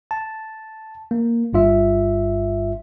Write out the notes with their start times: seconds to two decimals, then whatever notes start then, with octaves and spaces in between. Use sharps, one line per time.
0.11 A5
1.11 A#3
1.53 G1 G2 F4 E5